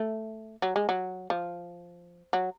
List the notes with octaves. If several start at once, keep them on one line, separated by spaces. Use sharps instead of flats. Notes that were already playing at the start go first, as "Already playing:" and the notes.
Already playing: A3
F#3
G#3
F#3
F3
F#3